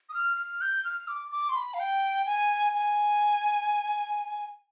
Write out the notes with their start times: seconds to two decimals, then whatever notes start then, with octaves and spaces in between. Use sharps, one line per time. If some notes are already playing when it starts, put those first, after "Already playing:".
0.09 D#6
0.14 F6
0.37 F6
0.61 G6
0.84 F6
1.08 D6
1.32 D6
1.49 C6
1.56 B5
1.74 F5
1.80 G5
2.26 G#5
2.75 G#5